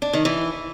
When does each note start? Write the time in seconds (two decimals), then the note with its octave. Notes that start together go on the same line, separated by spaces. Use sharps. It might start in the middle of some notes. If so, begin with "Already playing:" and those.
0.02 D4
0.13 D#3
0.25 E3